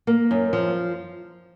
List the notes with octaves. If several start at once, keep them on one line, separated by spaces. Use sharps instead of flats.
A#3
F#2
F3